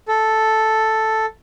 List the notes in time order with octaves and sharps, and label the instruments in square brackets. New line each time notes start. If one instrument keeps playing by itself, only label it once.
[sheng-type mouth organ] A4